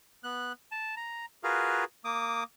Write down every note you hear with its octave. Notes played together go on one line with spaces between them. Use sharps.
B3 F#6
A5
A#5
F4 F#4 G#4 A#4 B4 F5
A#3 D6 D#6